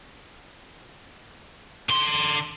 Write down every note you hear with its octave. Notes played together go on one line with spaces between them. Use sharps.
D3 C6